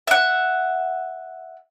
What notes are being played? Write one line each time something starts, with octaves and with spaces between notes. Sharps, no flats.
E5 F#5